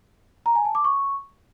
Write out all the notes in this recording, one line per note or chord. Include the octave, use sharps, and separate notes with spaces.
A#5
G#5
A5
D6
C#6